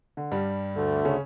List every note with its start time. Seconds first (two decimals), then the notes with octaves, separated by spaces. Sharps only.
0.17 D3
0.32 G2 G3
0.75 D2 D3 A3
1.05 C#3 C#4